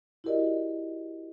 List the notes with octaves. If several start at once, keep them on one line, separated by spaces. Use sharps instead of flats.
E4 F#4 G4 A#4 D5 D#5